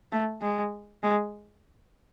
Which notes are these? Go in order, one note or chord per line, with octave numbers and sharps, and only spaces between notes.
A3
G#3
G#3